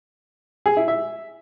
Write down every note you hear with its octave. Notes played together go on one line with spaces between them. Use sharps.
G#4
E4
E5